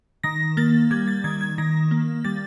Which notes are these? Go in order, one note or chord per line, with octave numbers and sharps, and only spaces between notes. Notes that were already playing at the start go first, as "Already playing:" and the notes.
D#3 A#6
A#3 A6
G3 G#6
A6
D#3 G#6
G#6
D#3 A#6
A#3
G3 A6